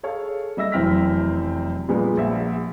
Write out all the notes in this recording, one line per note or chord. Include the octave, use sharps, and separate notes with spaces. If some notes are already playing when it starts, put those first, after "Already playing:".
G#4 A4 C#5 F5
G3 D#5 E5 E6 A#6
F1 F#2 E3 C4 F6 B6
A#2 F3 G3 G#3 B3
A#1 E5 F#5